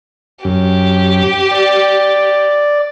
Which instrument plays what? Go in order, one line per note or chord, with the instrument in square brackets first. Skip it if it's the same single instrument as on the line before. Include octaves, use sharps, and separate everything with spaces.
[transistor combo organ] F#2 [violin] G4
[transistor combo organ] D5